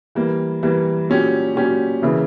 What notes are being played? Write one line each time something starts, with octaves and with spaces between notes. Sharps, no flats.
E3 G3 A#3
E3 G3 A#3
A#2 F#3 C#4 G4
A#2 F#3 C#4 G4
C#3 E3 A#3 E4